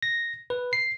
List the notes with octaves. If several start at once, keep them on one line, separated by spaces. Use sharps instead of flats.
A#6
B4
C7